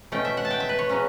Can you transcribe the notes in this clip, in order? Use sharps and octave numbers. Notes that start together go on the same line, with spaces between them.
B2 A3 C#4 G5
E5
F#5
A5
G5
E5
B4
C#5
C#3 F#3 C#4